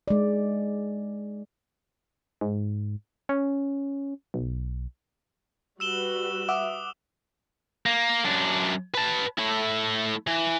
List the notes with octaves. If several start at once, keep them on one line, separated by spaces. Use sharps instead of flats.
G#3 D5
G#2
C#4
B1
G3 F#4 B4 E6 E7 G7
E5 F#5 D6 D#6
A#3
F#2 D4
B4 A5
A3 E4
E3